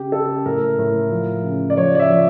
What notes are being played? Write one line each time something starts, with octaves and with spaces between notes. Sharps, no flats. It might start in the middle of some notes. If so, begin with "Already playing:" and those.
Already playing: C#3 G4
C#3 A4
A2 A#4
A2
F3
C#3
D5
F3 C#5
D5
E5
F3